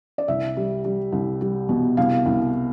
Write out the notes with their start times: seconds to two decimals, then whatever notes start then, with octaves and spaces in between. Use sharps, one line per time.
0.18 D5
0.28 C2 E5
0.57 G3
0.85 G3
1.12 C2
1.41 G3
1.69 B2
1.97 C2 F5
2.26 C2